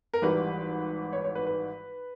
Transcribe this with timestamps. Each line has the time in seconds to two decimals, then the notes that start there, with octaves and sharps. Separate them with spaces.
0.14 A#4
0.22 G#1 G#2 E3 G3 B4
1.13 C#5
1.24 C#5
1.35 B4
1.46 B4